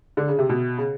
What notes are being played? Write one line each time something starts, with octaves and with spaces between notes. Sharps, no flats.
D3
C#3
C3
B2
C#3